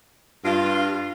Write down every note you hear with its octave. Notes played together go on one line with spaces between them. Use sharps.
G2 F4